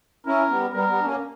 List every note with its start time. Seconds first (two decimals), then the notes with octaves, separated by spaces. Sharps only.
0.26 C#4 E4 A#4
0.50 G3 B3
0.74 G3 B3 A#4
0.89 G3 B3
1.01 D4
1.04 A#3 C#4